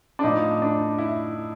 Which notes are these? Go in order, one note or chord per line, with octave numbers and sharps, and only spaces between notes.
D4
A2 F3 D#4
D4
E4